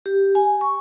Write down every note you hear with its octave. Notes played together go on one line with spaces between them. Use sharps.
G4
G#5
C#6